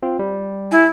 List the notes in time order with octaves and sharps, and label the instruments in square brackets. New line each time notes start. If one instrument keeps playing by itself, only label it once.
[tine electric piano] C4 F4
G3
[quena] E4 [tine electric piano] G#5